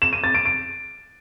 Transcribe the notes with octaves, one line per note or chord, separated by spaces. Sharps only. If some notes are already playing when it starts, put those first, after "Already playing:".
E7
D#7
A6
D7
D7